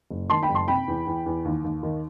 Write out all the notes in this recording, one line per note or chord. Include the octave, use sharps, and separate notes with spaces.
F#1
D#3 A5 C6
G5 B5
F#1
A5 C6
C3 G5 B5
E2
E2
E2
D#2
D#2
D#3